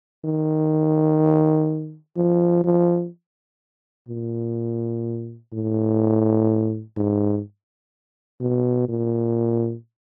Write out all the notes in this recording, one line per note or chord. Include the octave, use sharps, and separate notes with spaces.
D#3
F3
F3
A#2
A2
G#2
B2
A#2